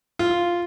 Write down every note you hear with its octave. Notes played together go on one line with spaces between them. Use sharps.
F4